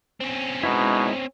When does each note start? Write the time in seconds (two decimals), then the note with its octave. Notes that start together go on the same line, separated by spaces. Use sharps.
0.20 C4 C#4
0.63 B2 G#3 D#4 E4